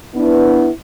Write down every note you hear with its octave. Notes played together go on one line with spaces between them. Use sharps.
B3 D4 E4 B4